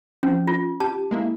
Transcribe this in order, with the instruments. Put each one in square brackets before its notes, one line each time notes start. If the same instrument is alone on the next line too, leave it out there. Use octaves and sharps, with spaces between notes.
[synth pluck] F3 [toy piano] C#4
[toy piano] F4
[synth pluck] G4 [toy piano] A5
[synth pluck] G#3 A#3 E4